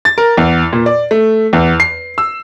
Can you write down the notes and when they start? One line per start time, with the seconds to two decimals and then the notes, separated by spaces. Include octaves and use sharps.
0.05 A6
0.18 A#4
0.37 E2
0.73 A#2
0.86 D5
1.11 A3
1.53 E2
1.80 C7
2.18 E6